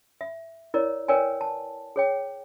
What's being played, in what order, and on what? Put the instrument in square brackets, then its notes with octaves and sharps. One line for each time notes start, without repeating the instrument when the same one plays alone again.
[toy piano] E5
E4 A#4 C#5 D5
A#4 B4 C#5 D5 G5 G#5
A5
G#4 C#5 G5